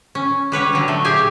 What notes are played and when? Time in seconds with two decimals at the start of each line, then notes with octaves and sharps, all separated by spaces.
0.15 C#4
0.52 G3 B4 C#5 F#5
0.73 D3 F#3
0.88 A3
1.05 A#2 F#3 G4 G#4 G#5